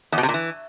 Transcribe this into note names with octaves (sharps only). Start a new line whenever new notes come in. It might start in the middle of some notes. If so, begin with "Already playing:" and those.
E2
B2
C3
A#2
E3